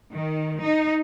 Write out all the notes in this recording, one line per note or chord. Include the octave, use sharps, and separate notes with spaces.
D#3
D#4